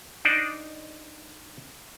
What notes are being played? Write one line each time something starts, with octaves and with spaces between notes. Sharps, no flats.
D4 D#4 C5 D5